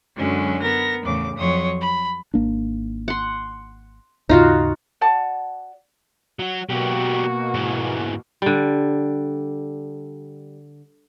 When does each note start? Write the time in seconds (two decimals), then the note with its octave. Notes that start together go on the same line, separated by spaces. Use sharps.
0.17 F#2 D3 F#3 G#3 C#4
0.61 B3 A#4 A#6
1.04 E2 A2 C#3 D6
1.37 F2 F#3 C#5 C6 D#6
1.83 B5
2.34 G#1 A#3 D4
3.08 F#5 C6
4.29 D#2 G#2 C#3 D#4 F4 F#4
5.01 F#4 D5 F#5 A5
6.39 F#3 F#4
6.69 B2 F#3 A#3 F#4 G4
7.54 G#2 E3
8.42 D3 G3